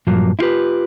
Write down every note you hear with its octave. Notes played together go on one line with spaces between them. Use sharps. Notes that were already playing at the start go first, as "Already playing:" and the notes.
G2 A#2 F3 F#3 A#3
E4 F4 G4 B4